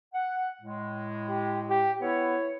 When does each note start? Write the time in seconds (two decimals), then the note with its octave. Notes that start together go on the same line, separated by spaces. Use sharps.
0.14 F#5
0.62 A2 G#3
1.29 G4
1.70 G4
2.02 B3 E4 C#5